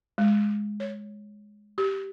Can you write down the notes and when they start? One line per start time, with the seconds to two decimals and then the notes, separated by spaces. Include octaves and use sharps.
0.18 G#3
0.80 C#5
1.78 G4